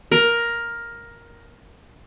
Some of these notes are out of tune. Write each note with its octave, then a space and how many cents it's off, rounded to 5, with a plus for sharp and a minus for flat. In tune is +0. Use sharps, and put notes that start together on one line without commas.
A#4 +10